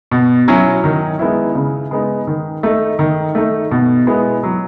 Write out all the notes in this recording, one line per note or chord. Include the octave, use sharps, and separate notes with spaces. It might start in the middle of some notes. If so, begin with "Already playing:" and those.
B2
F#3 C#4 E4
D#3
G#3 B3 E4
C#3
G#3 B3 D#4
D#3
A3 D#4
D#3
A3 D#4
B2
G#3 B3 E4
F#3